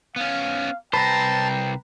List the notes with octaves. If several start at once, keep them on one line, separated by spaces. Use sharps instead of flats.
B3 C#4 F5
C2 B4 C5 G5 A5 A#5